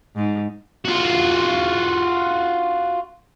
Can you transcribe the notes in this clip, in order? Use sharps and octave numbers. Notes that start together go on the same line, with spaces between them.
G#2
F4 F#4